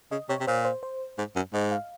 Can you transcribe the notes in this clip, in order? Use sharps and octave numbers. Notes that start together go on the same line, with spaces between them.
C#3 D#5
C3 C#5
C3
A#2 C5
C5
C5
G#2
F#2
G#2 D#5
F5